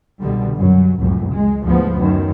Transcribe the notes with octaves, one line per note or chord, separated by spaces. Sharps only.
C2 B2 D3 G3
F#2 F#3
F1 C#2 F#2 A2
G#3
D2 G#2 F3 B3
F#2 D#3